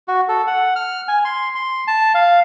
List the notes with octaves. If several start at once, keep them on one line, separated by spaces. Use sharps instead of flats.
F#4
A4
F#5
F6
G#5
C6
C6
A5
F5